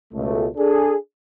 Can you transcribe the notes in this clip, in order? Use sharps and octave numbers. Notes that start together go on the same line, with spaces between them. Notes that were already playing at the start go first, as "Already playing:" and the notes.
C#2 B2 A3
D4 G#4 A4